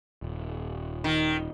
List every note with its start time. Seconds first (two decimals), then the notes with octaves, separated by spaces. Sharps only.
0.22 D#1
1.04 D#3